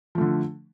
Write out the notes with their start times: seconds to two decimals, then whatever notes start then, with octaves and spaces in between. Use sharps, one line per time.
0.15 F3
0.18 A3
0.21 D3